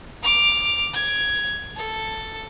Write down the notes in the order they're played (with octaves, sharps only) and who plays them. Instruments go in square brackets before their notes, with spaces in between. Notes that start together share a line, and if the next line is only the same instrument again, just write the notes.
[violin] D6 F6
G#6
A4